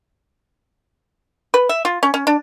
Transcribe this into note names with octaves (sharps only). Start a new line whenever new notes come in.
B4
E5
F4
C#4
C#4
D4